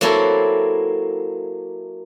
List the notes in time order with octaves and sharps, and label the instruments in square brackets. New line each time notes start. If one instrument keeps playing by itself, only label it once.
[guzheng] F#3 A#3 C4 E4 A4 C#5